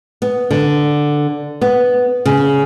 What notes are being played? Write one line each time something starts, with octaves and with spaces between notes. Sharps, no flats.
B3
D3
B3
C#3